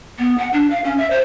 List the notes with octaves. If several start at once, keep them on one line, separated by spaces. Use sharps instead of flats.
B3
F#5
D4
F5
C#4
E5
C5